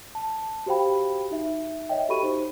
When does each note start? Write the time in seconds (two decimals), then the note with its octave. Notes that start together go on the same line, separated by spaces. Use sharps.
0.15 A5
0.66 F#4 G4 C5 F5 G5 B5
1.31 D#4 E5
1.89 C#5 D#5 E5 G5
2.09 F#4 G4 A4 B5 C#6 D#7
2.23 D#4 C5